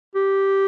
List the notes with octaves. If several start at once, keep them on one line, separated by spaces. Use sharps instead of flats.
G4